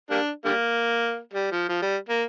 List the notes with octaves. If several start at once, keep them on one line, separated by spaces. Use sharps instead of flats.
G3 A#3 D4
D3 G3 A#3
G3
F3
F3
G3
A#3